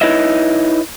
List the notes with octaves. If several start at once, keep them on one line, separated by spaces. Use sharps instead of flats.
D#4 E4 B4 C#5 D#5 E5